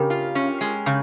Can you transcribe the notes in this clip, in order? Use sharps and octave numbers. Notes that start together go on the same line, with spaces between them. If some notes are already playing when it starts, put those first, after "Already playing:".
Already playing: C#3 G4 A#4
F4
C#4
G#3
C#3